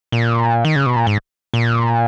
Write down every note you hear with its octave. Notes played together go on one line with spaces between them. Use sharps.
A#2
D#3
C#3
B2
A#2
G#2
A#2